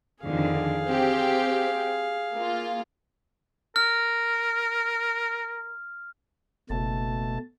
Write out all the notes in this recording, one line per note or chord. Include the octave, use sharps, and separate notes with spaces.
F2 D3 D#3 G#4 F5
C4 G4
A#3 F4
A#4 F6
F#1 B2 A3 A5